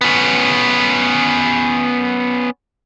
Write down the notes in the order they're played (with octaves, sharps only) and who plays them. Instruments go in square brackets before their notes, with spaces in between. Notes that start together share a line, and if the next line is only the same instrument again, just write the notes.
[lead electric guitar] B3 C#4